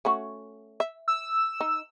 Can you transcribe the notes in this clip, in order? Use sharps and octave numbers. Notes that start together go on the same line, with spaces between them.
A3 C#4 F#4
E5
E6
D#4